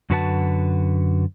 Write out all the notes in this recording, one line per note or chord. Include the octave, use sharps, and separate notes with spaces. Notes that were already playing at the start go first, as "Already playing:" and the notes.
F#2 D3 F#4 B4 F#5 A5